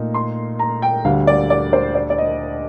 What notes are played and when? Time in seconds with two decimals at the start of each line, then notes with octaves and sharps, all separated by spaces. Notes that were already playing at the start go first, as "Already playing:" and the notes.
Already playing: A#2 A3 D#4 A#4
0.14 C6
0.59 A#5
0.82 G5
1.05 D2 D3 G3 F5
1.27 D5
1.50 D5
1.73 C5
1.95 D5
2.10 D5
2.18 D#5